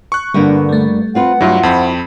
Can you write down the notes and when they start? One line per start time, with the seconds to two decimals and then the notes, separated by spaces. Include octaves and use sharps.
0.12 C#6 F#6
0.34 G2 D3 G3 A#3 B3 D4
0.69 G3 A3
1.15 C4 F4 B4 F#5
1.41 G2 F#3 E4 F4
1.63 F2 C4 B5